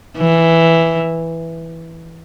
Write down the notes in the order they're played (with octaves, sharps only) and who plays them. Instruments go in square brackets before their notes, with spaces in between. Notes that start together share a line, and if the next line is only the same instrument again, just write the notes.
[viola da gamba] E3